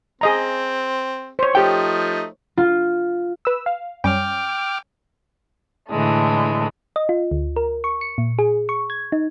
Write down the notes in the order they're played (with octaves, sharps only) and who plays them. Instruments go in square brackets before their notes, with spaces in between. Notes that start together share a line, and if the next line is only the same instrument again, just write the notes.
[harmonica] C4 [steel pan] G#4 D#5 A#5
[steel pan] C5 C#5
[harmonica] F3 A3 D#4 [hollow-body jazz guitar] G4 G5
[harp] F4
[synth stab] B4 E6
F5
[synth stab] F#2 G3 C#4 [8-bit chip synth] G5 D6 F6
[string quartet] A2 D3 E3 G#3 A3
[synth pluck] D#5
F4
D2
A#4
C#6
C#7
A#2
G#4
C#6
G#6
D#4